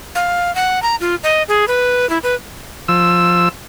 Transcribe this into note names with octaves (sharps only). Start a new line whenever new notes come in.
F5
F#5
A#5
F4
D#5
G#4
B4
E4
B4
F3 E6